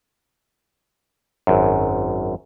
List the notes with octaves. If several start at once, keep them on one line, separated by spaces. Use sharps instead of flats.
G#1 F#2